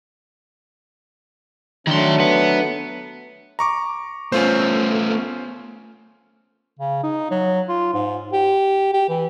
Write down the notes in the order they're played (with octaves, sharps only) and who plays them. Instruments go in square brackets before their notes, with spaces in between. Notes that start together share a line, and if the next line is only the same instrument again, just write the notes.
[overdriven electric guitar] D#3 C6 [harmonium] F#3 A3 D4
[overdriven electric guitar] B3
[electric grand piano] A#5 C#6 D6
[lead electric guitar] A3 B3 [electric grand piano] C#4 F4 C5
[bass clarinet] C#3
D#4
F#3
F4
G#2
G4
G4
E3